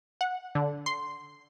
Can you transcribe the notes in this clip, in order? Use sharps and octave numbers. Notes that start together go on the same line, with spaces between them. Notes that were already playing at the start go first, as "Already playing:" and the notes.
F#5
D3
C6